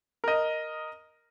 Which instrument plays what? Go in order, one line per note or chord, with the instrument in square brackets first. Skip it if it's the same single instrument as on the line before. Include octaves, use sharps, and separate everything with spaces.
[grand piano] A#4 D#5